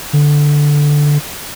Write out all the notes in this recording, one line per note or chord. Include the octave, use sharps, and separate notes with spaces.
D3